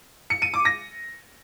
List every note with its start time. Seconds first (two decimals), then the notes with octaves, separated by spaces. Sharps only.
0.30 C#7
0.42 D#7
0.54 D6
0.65 A#6